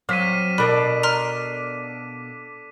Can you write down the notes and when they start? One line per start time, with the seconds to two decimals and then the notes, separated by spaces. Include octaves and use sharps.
0.09 F#3 C4 F5 D6 B6 D#7
0.58 B2 D4 A4 A#4 D5 B5
1.03 A#5 C6 F6